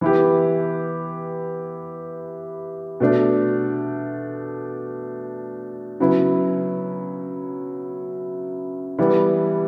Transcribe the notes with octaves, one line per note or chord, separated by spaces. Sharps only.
E3 B3 E4 G4
B2 A3 D4
C#3 F#3 B3 E4
E3 G3 B3 E4